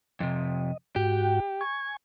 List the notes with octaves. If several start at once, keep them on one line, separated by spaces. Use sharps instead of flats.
F2 C3 D#5
G#2 F#4 G4 G5
G#5 C#6 G#6